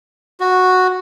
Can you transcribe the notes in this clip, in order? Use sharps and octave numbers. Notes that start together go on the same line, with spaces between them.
F#4